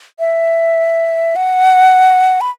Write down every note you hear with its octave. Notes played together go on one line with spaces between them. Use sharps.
E5
F#5
B5